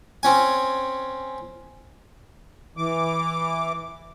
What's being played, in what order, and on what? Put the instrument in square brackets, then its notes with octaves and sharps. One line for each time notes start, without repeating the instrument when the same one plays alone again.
[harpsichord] C4 C#4 G#5
[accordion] E3 D6